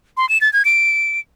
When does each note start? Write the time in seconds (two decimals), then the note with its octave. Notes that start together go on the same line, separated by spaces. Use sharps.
0.17 C6
0.29 E7
0.41 A6
0.53 G#6
0.65 D7